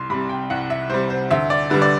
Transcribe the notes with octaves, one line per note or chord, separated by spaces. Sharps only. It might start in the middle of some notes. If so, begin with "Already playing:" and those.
Already playing: C2 C6
C3 G3 B5
G5
C2 F#5
E5
C3 G3 C5
C5
D2 E5
D5
D3 G3 B4
D5